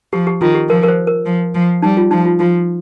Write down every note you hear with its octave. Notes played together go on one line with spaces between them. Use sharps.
F3 G4
G4
D#3 F4
G4
F3 A#4
A#4
C5
A#4
F3
F3
G3 D#4
F4
F3 D#4
F4
F3 F4